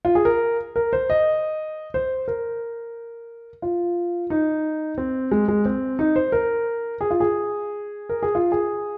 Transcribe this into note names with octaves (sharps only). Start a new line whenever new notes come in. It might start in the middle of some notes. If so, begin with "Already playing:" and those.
F4
G#4
A#4
A#4
C5
D#5
C5
A#4
F4
D#4
C4
G#3
G#3
C4
D#4
C5
A#4
G#4
F4
G#4
A#4
G#4
F4
G#4